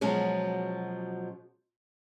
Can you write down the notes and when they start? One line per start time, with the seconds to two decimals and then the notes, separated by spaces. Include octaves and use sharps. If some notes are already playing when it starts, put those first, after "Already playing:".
0.01 B2 F3 F#3 G#3 C#4